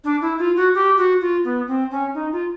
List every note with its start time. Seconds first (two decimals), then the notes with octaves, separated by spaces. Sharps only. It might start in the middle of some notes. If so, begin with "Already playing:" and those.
0.04 D4
0.21 E4
0.38 F4
0.56 F#4
0.74 G4
0.97 F#4
1.21 F4
1.44 B3
1.67 C4
1.91 C#4
2.14 D#4
2.32 F4